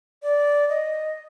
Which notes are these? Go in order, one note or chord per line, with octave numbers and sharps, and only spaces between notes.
D5
D#5